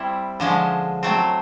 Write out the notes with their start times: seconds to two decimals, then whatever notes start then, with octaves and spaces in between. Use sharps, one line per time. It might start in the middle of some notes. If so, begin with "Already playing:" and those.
Already playing: G3 C4 E4
0.40 D3 F3 G#3 C#4
1.03 F#3 A3 C4